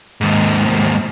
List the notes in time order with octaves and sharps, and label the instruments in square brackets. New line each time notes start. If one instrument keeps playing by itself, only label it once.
[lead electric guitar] D#2 G#2